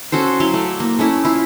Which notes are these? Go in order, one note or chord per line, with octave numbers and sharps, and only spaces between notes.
C#4 F#4 A4 C5
F#3 E4 F5 C6
A3 D5
A#3
A3 C#4 E4
E4 F4